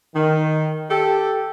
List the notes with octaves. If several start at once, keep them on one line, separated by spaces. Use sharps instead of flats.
D#3
G4 A4